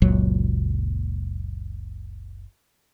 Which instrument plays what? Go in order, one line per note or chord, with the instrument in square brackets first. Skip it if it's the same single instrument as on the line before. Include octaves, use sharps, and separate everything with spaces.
[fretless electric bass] F#1 C#2 A#2 F#3